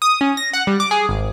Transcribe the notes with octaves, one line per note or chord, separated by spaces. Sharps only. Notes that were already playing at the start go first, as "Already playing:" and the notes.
D#6
C#4
A#6
F#5
G3
D6
G#4
G#1